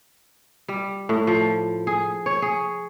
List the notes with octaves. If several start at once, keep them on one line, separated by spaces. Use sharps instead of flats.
G3
A2
F3
G#4
C#5
G#4